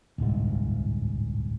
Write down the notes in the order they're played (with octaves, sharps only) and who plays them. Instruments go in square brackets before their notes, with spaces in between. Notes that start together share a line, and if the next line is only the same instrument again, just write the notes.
[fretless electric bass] D1 G1 C2 G#2